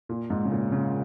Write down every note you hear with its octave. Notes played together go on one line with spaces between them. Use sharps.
A#2
G#2
C#3
A#2
C#3